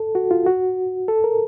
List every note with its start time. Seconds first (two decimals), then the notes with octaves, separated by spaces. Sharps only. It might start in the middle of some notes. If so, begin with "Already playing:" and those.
Already playing: A4
0.15 F#4
0.31 F4
0.46 F#4
1.08 A4
1.24 A#4